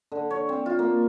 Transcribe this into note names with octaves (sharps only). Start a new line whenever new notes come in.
D3
C#5
C4
F4
A#3